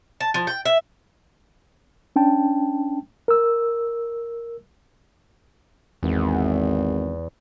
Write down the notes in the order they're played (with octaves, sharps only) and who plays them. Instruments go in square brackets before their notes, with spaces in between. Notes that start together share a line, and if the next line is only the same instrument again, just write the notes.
[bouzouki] A5
F3
G5
E5
[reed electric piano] C#4 D4 G5 A5
A#4 E6
[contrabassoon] G#1 [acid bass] E2